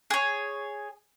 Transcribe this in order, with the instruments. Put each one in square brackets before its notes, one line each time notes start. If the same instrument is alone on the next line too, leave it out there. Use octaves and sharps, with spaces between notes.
[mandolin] G#4 C#5